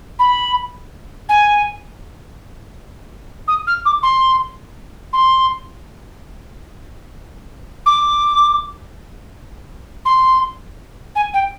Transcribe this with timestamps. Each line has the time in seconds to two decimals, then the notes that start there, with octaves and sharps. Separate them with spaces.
0.19 B5
1.29 G#5
3.48 D#6
3.67 F6
3.85 D6
4.03 C6
5.13 C6
7.86 D6
10.05 C6
11.15 G#5
11.34 G5